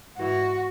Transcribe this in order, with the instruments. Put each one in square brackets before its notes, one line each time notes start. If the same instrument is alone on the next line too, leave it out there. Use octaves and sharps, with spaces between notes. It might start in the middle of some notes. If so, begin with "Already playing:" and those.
[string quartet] G#2 E3 F#4